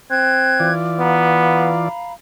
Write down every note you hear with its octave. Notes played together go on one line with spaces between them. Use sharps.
C4 F#6 G#6
E3 F4 D5
B3 F5 A#5 B5